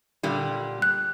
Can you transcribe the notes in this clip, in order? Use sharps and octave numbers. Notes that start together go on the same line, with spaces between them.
A#2 D3 G3
F#6